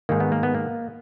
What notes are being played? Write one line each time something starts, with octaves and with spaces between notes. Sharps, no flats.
G#2 D#3 A#3
B3
A#3
B3
A#3